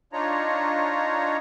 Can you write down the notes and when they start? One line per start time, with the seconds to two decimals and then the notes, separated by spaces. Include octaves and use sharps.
0.13 D4 D#4 F4 C#5 A#5